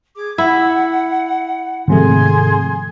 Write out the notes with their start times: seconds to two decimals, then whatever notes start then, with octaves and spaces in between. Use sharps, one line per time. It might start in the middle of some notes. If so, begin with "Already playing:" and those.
0.16 G#4 D6
0.38 E4 F#5
1.88 G#2 C3 D#3 F3 A3 G#4 G#5 C6